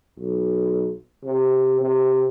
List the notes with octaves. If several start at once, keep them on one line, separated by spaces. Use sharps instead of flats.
B1
C3
C3